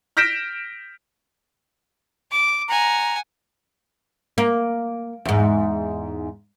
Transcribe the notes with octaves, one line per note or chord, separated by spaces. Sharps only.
F6 G6 A#6 B6 D7 E7
D6
F#5 G#5 A#5
A#3
E2 G#2